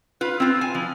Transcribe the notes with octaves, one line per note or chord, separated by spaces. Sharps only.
F4 B4
C4 F4
G#5
F3